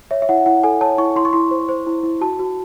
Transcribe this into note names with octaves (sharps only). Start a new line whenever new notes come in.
C#5 E5
E5
E4 F#5
E4 F#5
A4 G#5
C#5 A5
E4 C#6
E4 C6
C#6
E4 C6
C5
C5
E4
E4
F#4 A5
F#4